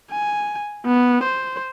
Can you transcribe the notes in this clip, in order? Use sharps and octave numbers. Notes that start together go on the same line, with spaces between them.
G#5
B3
C5